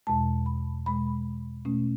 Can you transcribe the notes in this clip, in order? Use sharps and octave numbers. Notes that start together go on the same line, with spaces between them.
E2 B2 G#3 A5
B5
E2 B2 G#3 B5
B2 A3 C#4